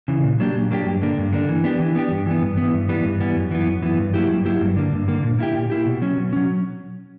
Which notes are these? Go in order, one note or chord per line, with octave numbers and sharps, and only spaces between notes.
C#3 E3
A#2
F#3 A#3 D4 G4
A#2
F#3 A#3 D4 G4
G2
D3 A#3 D4
G2
D3 A#3 D4
E3
B3 D4 G4
E3
B3 D4 G4
G2
E3 B3
G2
B3
E3
G2
E3 G3 B3
G2
E3 G3 B3
F#2
E3 B3
F#2
E3 B3
G2
F#3 A#3 E4 G4
G2
F#3 A#3 E4 G4
G2
D3 A#3
G2
D3 A#3
A#2
A#3 E4 G4
A#2
A#3 E4 G4
B2
F#3 C#4
B2
F#3 C#4